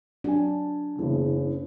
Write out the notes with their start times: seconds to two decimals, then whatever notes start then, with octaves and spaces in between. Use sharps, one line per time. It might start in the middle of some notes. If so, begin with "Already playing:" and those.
0.24 F#3 D4 G#5
0.99 F#1 E2 C#3